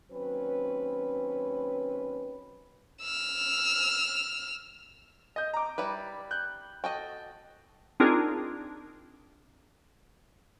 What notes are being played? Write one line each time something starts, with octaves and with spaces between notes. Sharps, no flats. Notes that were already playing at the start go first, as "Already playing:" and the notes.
D#2 F#3 C4 C#4 B4
E6 F6
D#5 G6
A#5 D6
G3 E4 B4
F#6 G6
F#4 A4 D#5 G5
C4 D4 D#4 F4 G#4 A#4